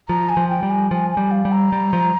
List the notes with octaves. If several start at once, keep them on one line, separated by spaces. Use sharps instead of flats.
F3 A#5
G#5
F3
G5
G3
G#5
F3 G#5
G#5
G3
F5
G3
A#5
G3
F3